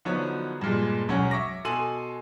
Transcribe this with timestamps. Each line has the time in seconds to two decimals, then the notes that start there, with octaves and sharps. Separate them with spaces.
0.05 D3 F3 F#3 B3 D#4 C#5
0.61 G2 A#2 G#3
1.08 E1 B1 F#2 C#4 C#5 F#5
1.31 E5 C#6 D6 A#6
1.65 B2 A4 G#5 C6 D#7 F#7